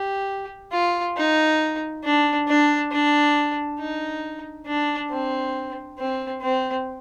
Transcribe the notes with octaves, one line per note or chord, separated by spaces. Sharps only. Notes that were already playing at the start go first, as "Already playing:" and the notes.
Already playing: G4
F4
D#4
D4
D4
D4
D#4
D4
C4
C4
C4